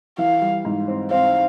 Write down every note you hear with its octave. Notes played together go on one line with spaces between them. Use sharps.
E3 F5
G3
G#2
C4
C4 F5